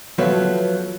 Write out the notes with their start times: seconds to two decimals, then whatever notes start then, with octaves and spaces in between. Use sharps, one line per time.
0.18 F3 F#3 A3 B3